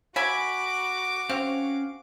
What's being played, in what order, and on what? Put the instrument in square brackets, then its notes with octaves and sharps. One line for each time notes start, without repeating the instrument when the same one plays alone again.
[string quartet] F#4 [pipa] E5 G#5 [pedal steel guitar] B5 [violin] D6
[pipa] C4 [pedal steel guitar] C#4 F5